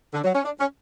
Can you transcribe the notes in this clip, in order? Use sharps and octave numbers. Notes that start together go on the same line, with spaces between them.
D3
F#3
C#4
D4
C#4